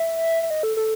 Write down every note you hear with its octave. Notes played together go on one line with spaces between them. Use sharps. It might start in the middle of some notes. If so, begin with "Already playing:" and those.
Already playing: E5
E5
D#5
A4
A4